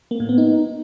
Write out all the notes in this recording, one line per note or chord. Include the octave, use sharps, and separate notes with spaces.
A#3
A2
B3
D#4